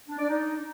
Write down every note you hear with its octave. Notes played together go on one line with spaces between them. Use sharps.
D4
D5
D#4